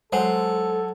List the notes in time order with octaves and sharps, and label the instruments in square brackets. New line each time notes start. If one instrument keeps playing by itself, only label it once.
[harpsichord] F#3 [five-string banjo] G#3 C5 [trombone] A4